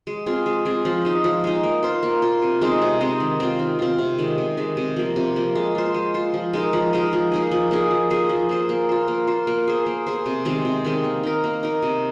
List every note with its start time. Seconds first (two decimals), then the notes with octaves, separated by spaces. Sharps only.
0.07 G#3
0.26 C4 F4 G#4
0.46 G#3
0.65 C4 F4 G#4
0.85 F3
1.05 G#3 D#4
1.24 F3
1.44 G#3 D#4
1.63 A#3
1.83 F4 C5
2.03 A#3
2.22 F4 C5
2.42 C3
2.61 G#3 C4 D#4
2.82 C3
3.01 G#3 C4 D#4
3.20 D#3
3.40 C4 F4
3.59 D#3
3.79 C4 F4
3.99 C3
4.19 D#3 G#3
4.38 C3
4.57 D#3 G#3
4.77 C3
4.96 F3 A#3
5.16 C3
5.36 F3 A#3
5.55 G#3
5.75 F4 C5
5.94 G#3
6.14 F4 C5
6.34 F3
6.53 G#3 D#4 A#4
6.73 F3
6.93 G#3 D#4 A#4
7.13 F3
7.32 A#3 D#4 G#4
7.51 F3
7.71 A#3 D#4 G#4
7.91 F3
8.10 A#3 G#4 C5
8.29 F3
8.49 A#3 G#4 C5
8.69 A#3
8.89 F4 C5
9.08 A#3
9.27 F4 C5
9.47 A#3
9.67 G#4 C5
9.86 A#3
10.07 G#4 C5
10.26 C3
10.45 D#3 G#3 C4
10.65 C3
10.85 D#3 G#3 C4
11.04 A#3
11.23 D#4 A#4
11.44 A#3
11.63 D#4 A#4
11.83 C3